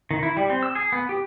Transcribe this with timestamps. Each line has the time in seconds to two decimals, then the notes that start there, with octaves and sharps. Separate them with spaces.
0.11 D#3
0.23 E4
0.37 G3
0.50 C4
0.63 E6
0.75 G#4
0.92 B3
1.09 G4